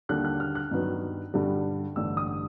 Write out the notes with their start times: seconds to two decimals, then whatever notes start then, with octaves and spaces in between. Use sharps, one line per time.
0.09 D#2 D3 G3 A#3 D4 F#6
0.25 F#6
0.40 F6
0.55 F#6
0.71 G2 D#3 F#3 B3
1.34 G2 D3 G3
1.96 A1 G2 D3 E6
2.17 D#6